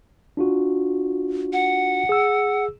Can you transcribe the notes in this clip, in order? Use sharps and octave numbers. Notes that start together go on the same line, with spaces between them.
D4 F4 F#4
F#5
G#4 E6